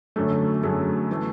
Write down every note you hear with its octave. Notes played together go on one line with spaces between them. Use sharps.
F#2 D3 F#3 A3 A4
F#2 D3 F#3 A3 G#4
E3 A3